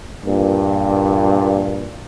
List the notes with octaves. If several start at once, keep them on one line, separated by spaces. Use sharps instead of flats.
G2 A#2